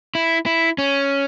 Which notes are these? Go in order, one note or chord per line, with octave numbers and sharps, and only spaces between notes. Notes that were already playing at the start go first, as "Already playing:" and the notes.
E4
E4
C#4